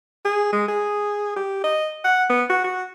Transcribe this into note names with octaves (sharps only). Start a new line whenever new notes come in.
G#4
G#3
G#4
G4
D#5
F#5
B3
F#4
F#4